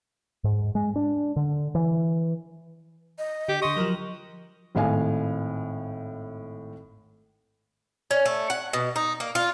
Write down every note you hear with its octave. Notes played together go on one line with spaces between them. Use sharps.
G#2
G#3
D4
D3
E3
D#5
D3 G4
D3 D#5 C6 C#6
F3 F#3 A#4
G#1 A2 F5 G#5
C#4
A3
F#5
B2
D#4
A#3
F4